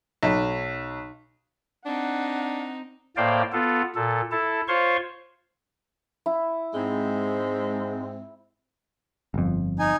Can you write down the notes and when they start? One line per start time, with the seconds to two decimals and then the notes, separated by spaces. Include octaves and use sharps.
0.23 B1
1.86 C4 D4 D#4 F#5
3.17 A2 A#3 C5 D5 F5 G5
3.52 B3 F4 A4
3.96 A#2 A4
4.32 E4 A4 A5
4.68 F4 C5 C#5 F5 C6 C#6
6.26 E4
6.74 G#2 G#3 C4
9.34 G1 F2
9.79 D#4 G#5